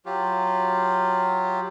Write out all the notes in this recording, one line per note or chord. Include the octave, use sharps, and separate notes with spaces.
F#3 F4 G4